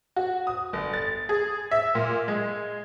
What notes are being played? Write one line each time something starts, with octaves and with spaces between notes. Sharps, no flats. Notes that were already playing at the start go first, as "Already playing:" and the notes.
F#4
D#6
G1
A6
G#4
E5
A#2
G#3